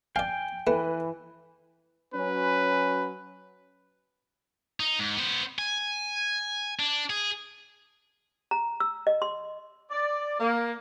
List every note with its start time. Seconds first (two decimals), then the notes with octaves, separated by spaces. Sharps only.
0.16 D5 F5 G5 G#5
0.67 E3 A3 B4
2.14 F#3 C#4 B4
4.80 D#4
4.99 G#2
5.16 B3 C5
5.59 G#5
6.79 D4
7.10 G#4
8.51 A#5
8.80 E6
9.07 D#5
9.22 C6
9.91 D5
10.40 A#3